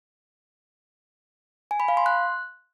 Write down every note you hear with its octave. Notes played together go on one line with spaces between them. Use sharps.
G#5
B5
F5
C6
F#6